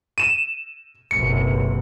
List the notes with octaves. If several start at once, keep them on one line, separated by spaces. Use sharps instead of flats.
D#7 E7
F#1 B1 C3 C#7